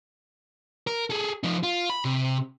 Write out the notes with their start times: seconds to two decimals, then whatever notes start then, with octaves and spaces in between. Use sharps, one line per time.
0.87 A#4
1.10 G#4 A4
1.43 F3 D#4
1.63 F4
1.90 B5
2.05 C3